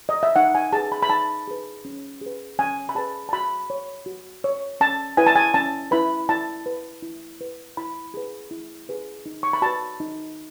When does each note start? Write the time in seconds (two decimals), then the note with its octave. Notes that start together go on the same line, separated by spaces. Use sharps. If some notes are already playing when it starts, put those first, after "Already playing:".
0.09 D#5
0.23 E5
0.36 D#4 F#5
0.55 G#5
0.72 G#4 B4 A5
0.92 B5
1.02 B5
1.10 D#4 A5
1.48 G#4 B4
1.85 C#4
2.21 G#4 B4
2.59 C#4 G#5
2.89 B5
2.95 G#4 B4 A5
3.29 A5
3.33 F#4 B5
3.70 C#5
4.06 F#4
4.44 C#5
4.81 C#4 A5
5.17 E4 B4 G#5
5.27 A5
5.36 G#5
5.54 C#4 A5
5.91 E4 B4 B5
6.29 E4 A5
6.66 B4
7.02 E4
7.41 B4
7.77 E4 B5
8.14 G#4 B4
8.51 E4
8.89 G#4 B4
9.26 D#4
9.43 C#6
9.53 B5
9.62 F#4 B4 A5
10.00 D#4